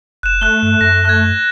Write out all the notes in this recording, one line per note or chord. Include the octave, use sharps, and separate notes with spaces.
F1 F#6 E7
A3 F#6 G7
G2
F#2 A#6
F#6 G#6